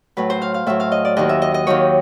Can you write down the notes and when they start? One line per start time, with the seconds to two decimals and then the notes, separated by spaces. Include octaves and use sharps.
0.17 A2 F#3 B4
0.30 C5
0.42 F5
0.54 F5
0.66 A2 F#3 E5
0.80 F5
0.92 D#5
1.05 D5
1.17 D#2 D#3 F#3 D#5
1.29 E5
1.42 D#5
1.54 D#5
1.67 D#2 D#3 F#3 C#5